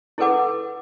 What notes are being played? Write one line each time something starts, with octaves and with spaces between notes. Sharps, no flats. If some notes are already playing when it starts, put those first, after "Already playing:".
E4 G#4 A4 B4 F#5 D6